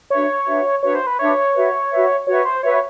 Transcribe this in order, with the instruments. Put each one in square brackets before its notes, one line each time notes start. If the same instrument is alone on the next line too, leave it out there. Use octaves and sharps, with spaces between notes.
[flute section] D4 F#4 B4 E5 [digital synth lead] C#5
[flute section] D4 F#4 B4 E5
[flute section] D4 F#4 B4 E5 [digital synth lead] C#5
[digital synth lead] C5
B4
[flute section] D4 F#4 B4 E5 [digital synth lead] C#5
[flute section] F#4 B4 E5
F#4 B4 E5
[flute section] F#4 B4 E5 [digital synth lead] C#5
[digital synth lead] C5
[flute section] F#4 B4 E5 [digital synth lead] C#5